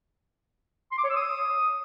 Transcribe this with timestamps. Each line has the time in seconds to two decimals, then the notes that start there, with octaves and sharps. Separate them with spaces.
0.92 C6
0.98 D6
1.04 C#5
1.10 E6
1.16 D#6